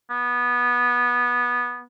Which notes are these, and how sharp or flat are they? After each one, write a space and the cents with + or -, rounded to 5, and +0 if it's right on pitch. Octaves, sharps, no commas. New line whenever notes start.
B3 -15